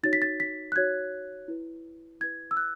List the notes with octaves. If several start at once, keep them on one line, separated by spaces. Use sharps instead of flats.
D#4 F#4 C#5 A6
B6
A6
B6
F#6
D#4 F#4 C#5 G#6
E4 B4
E4 B4 G#6
E6
F#6